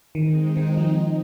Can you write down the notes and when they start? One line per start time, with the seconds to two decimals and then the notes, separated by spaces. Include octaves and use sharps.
0.15 D#3 G#3 C4 D#4
0.57 D#3
0.77 F3